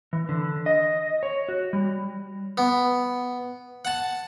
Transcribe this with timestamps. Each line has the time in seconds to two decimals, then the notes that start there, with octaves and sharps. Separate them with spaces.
0.13 E3
0.29 D3
0.66 D#5
1.23 C#5
1.49 F#4
1.73 G3
2.58 B3
3.85 F#5 A5